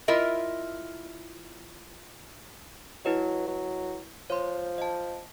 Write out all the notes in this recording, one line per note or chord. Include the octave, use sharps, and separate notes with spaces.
E4 F4 A#4 D#5 E5
F#3 E4 B4 D#5
F#3
F3 C#5 C6
D#5 A5